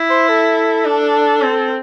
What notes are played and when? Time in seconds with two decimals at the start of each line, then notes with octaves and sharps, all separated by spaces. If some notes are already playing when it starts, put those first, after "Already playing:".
Already playing: E4
0.10 C5
0.29 A4
0.85 D4
1.41 C4